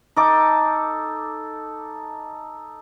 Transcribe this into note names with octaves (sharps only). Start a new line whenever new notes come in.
D#4 A4 D6